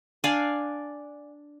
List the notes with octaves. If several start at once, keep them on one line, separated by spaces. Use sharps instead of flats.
D4 D5 F5 G#5